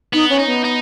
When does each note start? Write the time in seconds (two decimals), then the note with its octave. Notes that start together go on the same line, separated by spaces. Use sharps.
0.13 B3 D#4
0.30 C#4
0.39 D#4
0.47 B3
0.64 D#4